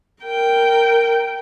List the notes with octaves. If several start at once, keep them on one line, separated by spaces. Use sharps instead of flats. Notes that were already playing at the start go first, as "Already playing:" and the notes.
A#4 G5